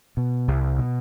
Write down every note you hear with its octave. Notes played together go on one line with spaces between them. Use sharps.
B2
C2
B2